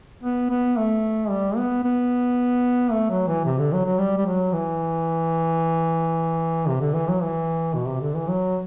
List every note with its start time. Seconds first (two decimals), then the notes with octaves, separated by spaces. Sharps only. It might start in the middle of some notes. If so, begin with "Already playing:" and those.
0.23 B3
0.50 B3
0.77 A3
1.30 G3
1.57 B3
1.84 B3
2.92 A3
3.10 F#3
3.27 E3
3.45 C3
3.59 D3
3.72 F#3
3.86 F#3
3.99 G3
4.18 G3
4.26 F#3
4.53 E3
6.68 C3
6.81 D3
6.94 E3
7.08 F#3
7.22 E3
7.74 B2
7.88 C3
8.02 D3
8.15 E3
8.29 F#3